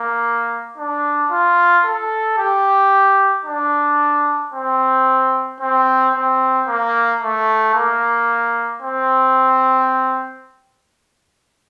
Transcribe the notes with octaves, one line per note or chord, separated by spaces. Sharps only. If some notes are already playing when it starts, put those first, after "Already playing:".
Already playing: A#3
D4
F4
A4
G4
D4
C4
C4
C4
A#3
A3
A#3
C4